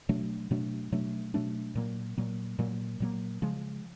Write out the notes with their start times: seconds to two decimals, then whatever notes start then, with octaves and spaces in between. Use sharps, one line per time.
0.09 B2 F#3 A3 D4
0.51 B2 F#3 A3 D4
0.92 B2 F#3 A3 D4
1.34 B2 F#3 A3 D4
1.75 A#2 F#3 A#3
2.18 A#2 F#3 A#3
2.59 A#2 F#3 A#3
3.00 A#2 F#3 A#3
3.42 C#3 F3 G#3